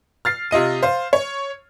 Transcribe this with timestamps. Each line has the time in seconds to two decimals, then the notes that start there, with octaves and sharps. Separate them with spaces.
0.25 F6 A6 C7
0.51 C3 F4 D#5 D#7
0.83 C5 F5
1.13 C#5